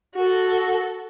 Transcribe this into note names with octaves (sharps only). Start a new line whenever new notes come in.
F#4 A4